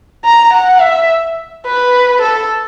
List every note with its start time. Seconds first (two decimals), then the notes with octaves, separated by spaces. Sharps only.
0.25 A#5
0.53 F#5
0.81 E5
1.66 B4
2.22 A4